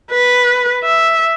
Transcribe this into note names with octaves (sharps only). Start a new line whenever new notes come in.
B4
E5